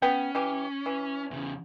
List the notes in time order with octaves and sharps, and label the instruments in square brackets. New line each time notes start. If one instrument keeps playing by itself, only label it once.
[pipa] B3 G5 [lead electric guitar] C#4
[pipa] E3 G4
E3
[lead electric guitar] E2 C#3